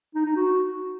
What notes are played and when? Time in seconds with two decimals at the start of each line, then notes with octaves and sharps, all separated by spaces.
0.15 D#4
0.26 D#4
0.36 F#4